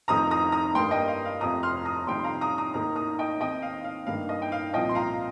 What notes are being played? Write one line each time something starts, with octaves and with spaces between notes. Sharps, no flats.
F1 F2 D#3 C4 A#5 D#6
A#5 D#6
A#5 D#6
G2 G3 A#3 G5 C6
D#5 G5
F5
F5
F1 F2 C3 A#5 D#6
C6 F6
A#5 D#6
F2 C3 D#3 G3 G5 C6
C6
F5 A#5
A#5 D#6
A#5 D#6
D#2 D#3 A#3 A#5 D#6
A#5 D#6
D#5 G5
D#2 D#3 C4 D#5 G5
F5
F5
G2 D#3 A#3 F5
D#5
G5
F5
C2 A#2 F3 C4 D#5 G5
C6
F5 A#5